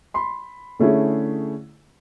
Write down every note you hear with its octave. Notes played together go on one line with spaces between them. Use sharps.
B5 C6
D3 A3 C#4 E4 G#4